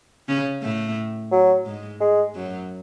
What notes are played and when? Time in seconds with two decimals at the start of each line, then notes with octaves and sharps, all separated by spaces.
0.28 C#3 C#4
0.62 A2 A3
1.32 F#3
1.66 G#2 G#3
2.00 G#3
2.35 F#2 F#3